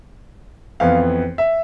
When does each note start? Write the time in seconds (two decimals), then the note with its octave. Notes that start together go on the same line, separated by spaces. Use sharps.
0.80 F2 E3 B3 F5
1.38 E5